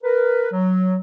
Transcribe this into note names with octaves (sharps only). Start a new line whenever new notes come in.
A#4 B4
F#3